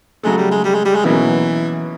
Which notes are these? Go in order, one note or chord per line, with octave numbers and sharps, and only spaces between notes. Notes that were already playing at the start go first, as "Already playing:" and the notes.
C#3 F#3 G#3 A3
G3
G#3
G3
G#3
G3
G#3
B2 E3 F#3 A#3 C#4